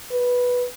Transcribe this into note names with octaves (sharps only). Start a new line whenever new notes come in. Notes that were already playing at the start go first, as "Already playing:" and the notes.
B4